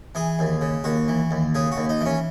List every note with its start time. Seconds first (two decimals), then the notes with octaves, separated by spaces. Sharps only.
0.15 E3 G#4
0.39 D#2
0.61 C#3
0.84 D#2 F#4
1.08 E3
1.31 D#2
1.55 C#3 G#4
1.72 F#4
1.77 D#2
1.89 D#4
2.01 E3 C#4